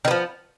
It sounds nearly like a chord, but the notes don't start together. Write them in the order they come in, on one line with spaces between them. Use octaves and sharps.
D#3 B3 F3